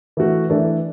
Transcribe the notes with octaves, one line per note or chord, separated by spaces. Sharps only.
E3 A3 F#4
E3 A3 D4 A4 D5